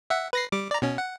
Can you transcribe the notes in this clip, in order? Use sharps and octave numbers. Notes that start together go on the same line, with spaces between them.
E5 F#5
B4 A#6 C7
G3 D6
D5 A#5
B2 C#4
F#5